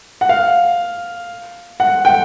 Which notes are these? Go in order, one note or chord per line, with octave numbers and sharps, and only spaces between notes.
F#5
F5
F#5
G5